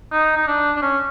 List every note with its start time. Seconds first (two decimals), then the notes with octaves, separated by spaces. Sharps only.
0.12 D#4
0.37 D#4
0.47 D4
0.76 D4
0.82 C#4